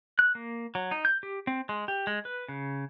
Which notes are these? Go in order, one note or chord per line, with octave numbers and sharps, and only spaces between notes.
F#6
A#3
F#3
D#4
G6
G4
C4
G#3
G4
G#3
B4
C#3